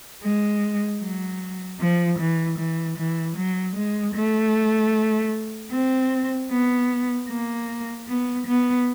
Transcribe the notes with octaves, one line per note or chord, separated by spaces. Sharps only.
G#3
F#3
F3
E3
E3
E3
F#3
G#3
A3
C4
B3
A#3
B3
B3